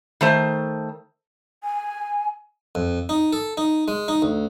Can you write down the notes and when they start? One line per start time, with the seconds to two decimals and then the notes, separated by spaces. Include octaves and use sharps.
0.21 D#3 A3 C5
1.63 G#5
2.75 F2
3.09 D#4
3.33 A4
3.57 D#4
3.88 G#3
4.08 D#4
4.22 D2